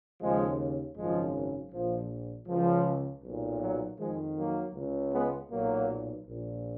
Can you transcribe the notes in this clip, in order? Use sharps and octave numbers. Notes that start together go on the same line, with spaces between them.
D#2 C#3 F3 G#3
G#1 F#2 C#3 F3 G#3
A#1 A#2 F3
C#2 C#3 F3
B1 A#2
F#3
F2 D#3 F3 G#3
F#3 A#3
C#2 C#3
G#3 B3
B1 A#2 F#3 A#3
A#1 A#2